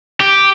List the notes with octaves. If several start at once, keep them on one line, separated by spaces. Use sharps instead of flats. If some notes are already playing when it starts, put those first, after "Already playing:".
G4